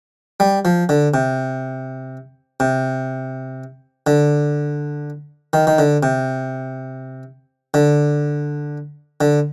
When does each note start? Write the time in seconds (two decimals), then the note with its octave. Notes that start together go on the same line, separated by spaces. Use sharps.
0.40 G3
0.65 F3
0.89 D3
1.14 C3
2.60 C3
4.07 D3
5.53 D#3
5.67 D#3
5.78 D3
6.03 C3
7.74 D3
9.21 D3